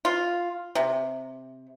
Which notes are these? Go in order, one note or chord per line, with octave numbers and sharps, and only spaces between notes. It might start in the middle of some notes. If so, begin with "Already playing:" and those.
F4
C3